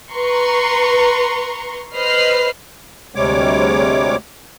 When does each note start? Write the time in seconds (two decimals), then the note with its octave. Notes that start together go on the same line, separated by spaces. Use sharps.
0.12 B4 A#5 C6 C#6
1.95 B4 C5 D#5 B5 F6 C7
3.15 D2 C3 G3 G#3 C#5 D6